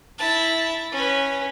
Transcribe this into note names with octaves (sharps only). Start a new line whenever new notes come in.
E4 A5
C#4 B4